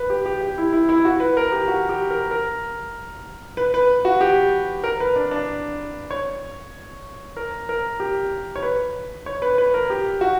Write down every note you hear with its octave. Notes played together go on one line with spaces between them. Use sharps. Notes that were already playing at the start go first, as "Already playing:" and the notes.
Already playing: B4
G4
G4
G4
E4
E4
E4
F#4
B4
A#4
G4
F#4
G4
A#4
A#4
B4
B4
F#4
G4
A#4
B4
D4
D4
C#5
A#4
A#4
G4
C#5
B4
C#5
B4
B4
A#4
G4
F#4